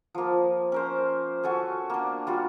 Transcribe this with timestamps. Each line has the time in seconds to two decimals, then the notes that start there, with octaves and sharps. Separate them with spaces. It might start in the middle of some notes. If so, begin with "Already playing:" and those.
0.14 F3 A#3
0.72 C#4 A#4 C5
1.43 C#4 F#4 A4 G#5
1.90 A#3 D4
2.27 G3 F4 F#4